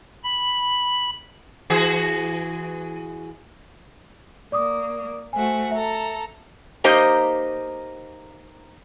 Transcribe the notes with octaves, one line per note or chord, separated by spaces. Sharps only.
B5
E3 F#4 G#4
A#3 D5 D6 D#6
A3 F#4 C5 G#5
A4 E5 A#5
A#3 D#4 G4 C5 D#5